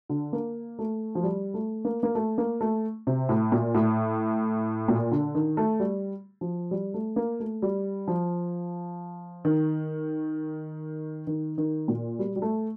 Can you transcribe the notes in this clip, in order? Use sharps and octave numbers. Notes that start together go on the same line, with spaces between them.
D3
A#3
A3
F3
G3
A3
A#3
A#3
A3
A#3
A3
C3
A2
A#2
A2
A#2
D3
D#3
A3
G3
F3
G3
A3
A#3
A3
G3
F3
D#3
D#3
D#3
A#2
G3
G3
A3